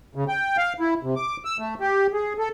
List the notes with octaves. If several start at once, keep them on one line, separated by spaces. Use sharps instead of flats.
C#3
G5
F5
E4
C3
D6
E6
A3
G4
G#4
A4